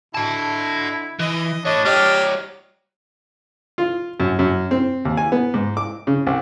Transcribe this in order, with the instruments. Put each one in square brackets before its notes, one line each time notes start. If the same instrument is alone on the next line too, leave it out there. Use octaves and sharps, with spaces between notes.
[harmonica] D3 [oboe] E4 [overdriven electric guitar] D#5 A5
[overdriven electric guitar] E3 [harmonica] D#5
[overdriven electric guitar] A3 C#5 [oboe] D4 [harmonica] D#5
[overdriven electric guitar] G3 C#5 [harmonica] G4 D#5 F6
[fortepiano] F4
F#2
F#2
C4
D#2
G#5
B3
G#2
D6
C#3
C2